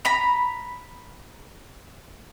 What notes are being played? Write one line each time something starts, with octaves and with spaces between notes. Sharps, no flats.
A#5 B5